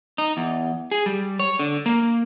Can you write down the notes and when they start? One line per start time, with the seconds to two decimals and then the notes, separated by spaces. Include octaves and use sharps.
0.18 D#4
0.37 E2
0.91 G#4
1.06 G3
1.39 C#5
1.59 D3
1.86 A#3